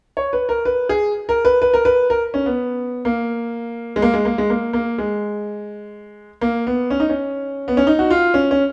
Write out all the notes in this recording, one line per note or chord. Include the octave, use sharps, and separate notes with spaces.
C#5
B4
A#4
B4
G#4
A#4
B4
B4
A#4
B4
A#4
C#4
B3
A#3
G#3
A#3
G#3
A#3
G#3
A#3
A#3
G#3
A#3
B3
C#4
D#4
C#4
B3
C#4
D#4
F#4
F4
C#4
C#4